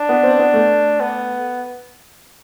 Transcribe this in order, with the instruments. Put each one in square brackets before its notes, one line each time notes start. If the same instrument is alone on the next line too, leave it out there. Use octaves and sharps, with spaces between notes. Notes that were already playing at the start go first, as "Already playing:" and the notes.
Already playing: [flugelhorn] D4
[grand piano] B3
C4
B3
A3
[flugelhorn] B3